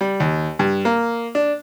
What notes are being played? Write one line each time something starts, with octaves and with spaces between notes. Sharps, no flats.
G3
D#2
G2
A#3
D4